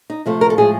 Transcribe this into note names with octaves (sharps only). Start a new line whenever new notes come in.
D#4
C3 F3 A3
A#4
A4
A2 F3 G#3 G#4